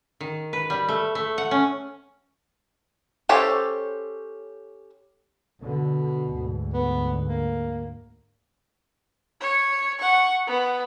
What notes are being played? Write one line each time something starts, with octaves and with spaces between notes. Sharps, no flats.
D#3
B4
G3
A3
A3
F#5
C#4
C#4 G4 A4 C5 C#5
B2 D3
D2 G#2 D3
B3
A#3
C#5
F#5 C#6
B3